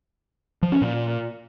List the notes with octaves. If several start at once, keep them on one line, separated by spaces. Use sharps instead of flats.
F3
C#4
A#2